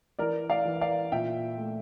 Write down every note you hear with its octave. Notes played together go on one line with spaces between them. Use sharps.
E3 A#4 D5
D5 F5
E3
D5 F5
A#2 E5 G5
A3